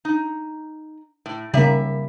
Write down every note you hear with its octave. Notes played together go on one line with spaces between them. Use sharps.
D#4
A2
C#3 G3 A#3 E5